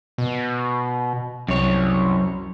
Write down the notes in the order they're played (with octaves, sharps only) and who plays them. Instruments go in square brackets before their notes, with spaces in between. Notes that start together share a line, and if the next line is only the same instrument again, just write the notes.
[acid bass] B2
[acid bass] C2 [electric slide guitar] F#2 C#5